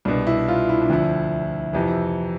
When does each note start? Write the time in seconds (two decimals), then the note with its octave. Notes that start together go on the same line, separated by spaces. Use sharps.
0.05 C2 B2 D4
0.27 E4
0.48 F4
0.69 E4
0.81 D4
0.89 D2 D3 F3 E4
1.73 F2 C3 E3